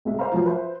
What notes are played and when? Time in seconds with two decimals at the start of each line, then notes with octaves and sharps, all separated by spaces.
0.05 C2 G#3 E5
0.19 B4 C5 D#5 F5 A#5
0.32 F3 F#3 F4
0.46 B4 C5 E5